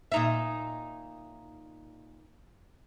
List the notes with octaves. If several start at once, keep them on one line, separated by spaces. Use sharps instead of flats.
A#2 D#4 E5